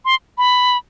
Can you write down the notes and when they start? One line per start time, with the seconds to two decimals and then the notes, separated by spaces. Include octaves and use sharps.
0.05 C6
0.38 B5